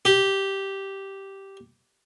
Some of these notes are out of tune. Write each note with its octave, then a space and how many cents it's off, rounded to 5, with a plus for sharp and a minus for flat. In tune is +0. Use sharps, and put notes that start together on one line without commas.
G4 -5